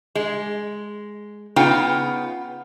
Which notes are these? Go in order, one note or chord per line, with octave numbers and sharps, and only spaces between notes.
G#3
C#3 B3 D#4 F4 G5